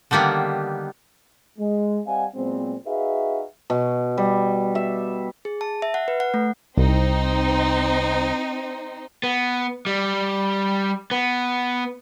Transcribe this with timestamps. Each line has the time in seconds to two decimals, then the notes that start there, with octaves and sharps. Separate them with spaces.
0.11 D3 D#3 G3 A#3 B3
1.58 G#3
2.06 G3 C4 D#5 F5 F#5 G#5
2.35 A#2 F#3 G#3 B3 C4
2.86 D#4 F#4 G#4 B4 E5 F5
3.70 B2
4.17 G3
4.75 E5
5.45 G#4
5.61 A5
5.82 E5
5.94 F#5
6.08 B4
6.20 F#5
6.34 A3
6.77 C2 C4 D#4
9.23 B3
9.87 G3
11.11 B3